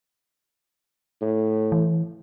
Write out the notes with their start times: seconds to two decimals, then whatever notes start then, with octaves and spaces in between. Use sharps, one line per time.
1.21 A2
1.72 E3